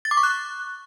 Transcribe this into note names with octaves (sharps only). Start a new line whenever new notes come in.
A6
D6
C#6
F#6